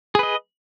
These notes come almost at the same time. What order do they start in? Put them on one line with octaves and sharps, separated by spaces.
G#4 B4 D#5